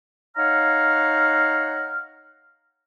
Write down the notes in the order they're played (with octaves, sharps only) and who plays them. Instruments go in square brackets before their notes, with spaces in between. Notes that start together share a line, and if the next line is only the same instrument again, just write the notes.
[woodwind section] D#4 C#5 F5 F#5 A#5 F6